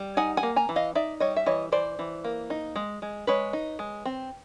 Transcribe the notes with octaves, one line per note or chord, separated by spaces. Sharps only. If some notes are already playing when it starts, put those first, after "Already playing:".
Already playing: G3
D#4 F#5 G#5
F#5 G#5
A#3
G#5 A#5
E3
D#5 F5
D#4 D5 E5
G3 C#5 D#5
E5
E3 C#5 D#5
E3 C5 D5
E3
A#3
D#4
G#3
G#3
G#3 B4 C#5
D#4
G#3
C4